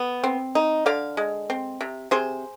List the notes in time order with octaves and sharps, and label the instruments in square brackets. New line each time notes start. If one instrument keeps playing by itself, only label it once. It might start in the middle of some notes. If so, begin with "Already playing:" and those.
Already playing: [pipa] B3
C4
D#4
D3 D5 F5
G#3
C4
C3
C3 G#4 C5